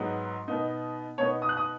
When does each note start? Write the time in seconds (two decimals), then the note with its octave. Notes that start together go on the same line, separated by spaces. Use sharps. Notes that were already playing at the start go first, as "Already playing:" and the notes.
Already playing: G#2 F#3 B3 D#4
0.48 B2 B3 D#4
1.18 B2 B3 D#4 C#5
1.42 D#6
1.49 F#6
1.57 D#6